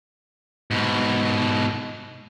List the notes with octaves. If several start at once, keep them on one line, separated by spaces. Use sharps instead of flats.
G#2 B2